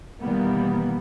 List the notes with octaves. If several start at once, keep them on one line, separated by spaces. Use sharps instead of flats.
B2 D#3 E3 G3 A#3 B3